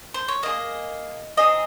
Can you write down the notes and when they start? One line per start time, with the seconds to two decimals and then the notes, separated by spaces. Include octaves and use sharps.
0.14 C5
0.28 C#5
0.43 A#3 F4 G#4 D#5
1.37 C4 D#4 G#4 D#5